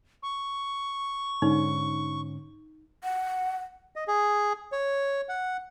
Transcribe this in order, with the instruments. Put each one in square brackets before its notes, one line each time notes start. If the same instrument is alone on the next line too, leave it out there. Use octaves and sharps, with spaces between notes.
[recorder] C#6
[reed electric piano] G#2 D3 C#4 [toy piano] D#4
[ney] F#5
[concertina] D#5
G#4
C#5
F#5